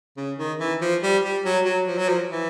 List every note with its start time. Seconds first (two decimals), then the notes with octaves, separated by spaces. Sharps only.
0.17 C#3
0.38 D#3
0.59 E3
0.81 F3
1.03 G3
1.23 G3
1.45 F#3
1.65 F#3
1.87 F3
1.98 F#3
2.09 F3
2.30 E3